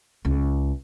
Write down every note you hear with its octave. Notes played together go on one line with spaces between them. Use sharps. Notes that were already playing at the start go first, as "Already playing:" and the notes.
C#2